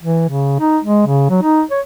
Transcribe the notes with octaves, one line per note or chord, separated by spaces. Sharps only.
E3
C#3
D#4
G#3
C#3
F#3
D#4
C#5